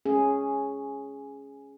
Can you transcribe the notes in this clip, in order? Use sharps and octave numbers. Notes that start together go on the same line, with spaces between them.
C#4 G#4